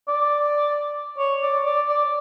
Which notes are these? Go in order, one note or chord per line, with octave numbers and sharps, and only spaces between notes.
D5
C#5
D5
D5
D5